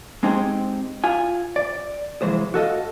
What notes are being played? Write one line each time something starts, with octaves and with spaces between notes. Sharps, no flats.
G#3 C4 D#4 G4 G#4 C5
F4 G#5
D5
C2 F2 E3 G#3 C5
F#4 A4 D#5 F5